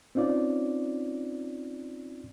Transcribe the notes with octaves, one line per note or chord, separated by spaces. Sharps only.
C4 C#4 D#4 F4 D5